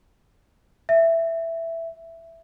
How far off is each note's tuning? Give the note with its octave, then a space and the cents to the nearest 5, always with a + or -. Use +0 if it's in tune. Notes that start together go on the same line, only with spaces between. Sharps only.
E5 +5